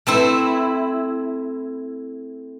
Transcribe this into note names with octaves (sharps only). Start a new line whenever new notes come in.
A3 C4 E4